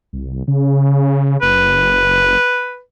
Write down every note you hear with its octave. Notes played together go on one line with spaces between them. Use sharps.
C2
C#3
F#1 B4